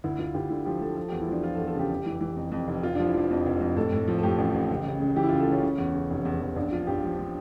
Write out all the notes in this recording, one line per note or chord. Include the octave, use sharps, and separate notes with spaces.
D2 E4
D2 F4
D2 G4
D3 E4
F3 G4
F3 A4
F3 A4
E2 G4
E4
F3 D4
F3 F4
A4
E2
A4
C#3 G4
F1
E3
E3
F2
F2
F1
F1 F4
F3 D4
E4
F3 D4
F2
F1
F2
A2 A4
A2
F3
A4
A2 G4
A1
A1
C#2
C#3
C#3
E3 G4
E4
C#2 F4
A4
C#3 C#4
C#3
E2
C#3
F1
E2
E2
A#1 D4
F3 F4
A#1 G4
F3
F3